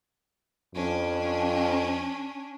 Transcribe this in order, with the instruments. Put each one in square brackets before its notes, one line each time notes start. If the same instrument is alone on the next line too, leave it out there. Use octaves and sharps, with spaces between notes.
[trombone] F2 [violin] C#4 D4